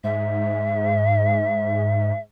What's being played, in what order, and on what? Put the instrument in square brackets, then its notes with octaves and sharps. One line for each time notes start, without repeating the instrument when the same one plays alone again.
[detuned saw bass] G#2 [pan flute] E5